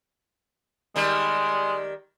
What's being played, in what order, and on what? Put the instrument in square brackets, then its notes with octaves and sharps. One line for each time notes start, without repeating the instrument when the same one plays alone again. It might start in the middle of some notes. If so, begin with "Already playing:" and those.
[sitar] D#3 G3 [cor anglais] G#3